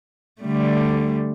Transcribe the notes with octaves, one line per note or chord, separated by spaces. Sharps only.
D3 G3 A3